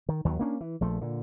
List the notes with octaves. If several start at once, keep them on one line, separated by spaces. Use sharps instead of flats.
D#3
D#2 D#3 F#3
A#3 C#4 D4
E3
A#1 F3 A3
A#2 D3